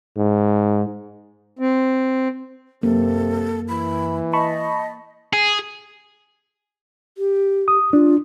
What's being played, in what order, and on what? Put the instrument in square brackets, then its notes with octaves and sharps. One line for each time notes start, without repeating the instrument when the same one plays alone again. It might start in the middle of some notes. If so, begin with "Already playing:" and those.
[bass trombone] G#2
[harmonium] C4
[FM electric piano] F#2 [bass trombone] C3 [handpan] A#3 [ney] A4
[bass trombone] E3 [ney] B5
[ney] D#5 [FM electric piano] A5 B5 C#6
[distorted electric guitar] G#4
[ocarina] G4
[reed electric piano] D#6
[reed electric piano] D4 [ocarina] F4